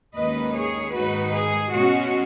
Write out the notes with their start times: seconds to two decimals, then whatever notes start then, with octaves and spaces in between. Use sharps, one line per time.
0.14 D#2 D#3 G#3 C#4 B4 D#5
0.53 G#4 C#5
0.92 G#2 D#3 G#3 D#4 F#4 B4
1.32 G#4
1.70 B2 G#3 C#4 F#4